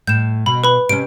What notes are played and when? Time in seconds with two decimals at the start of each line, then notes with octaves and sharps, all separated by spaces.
0.07 A2 G6 E7
0.46 B2 B5
0.64 B4 B5
0.89 C3 C#4 D7